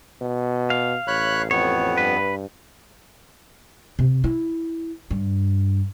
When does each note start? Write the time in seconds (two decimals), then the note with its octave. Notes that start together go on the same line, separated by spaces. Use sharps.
0.21 B2
0.70 F5
1.07 A1 C#5 B5 F#6
1.51 F2 B3 C#5
1.97 G2 B4
3.99 C3
4.24 E4
5.11 G2